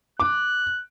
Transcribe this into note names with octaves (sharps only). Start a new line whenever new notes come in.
D6 F#6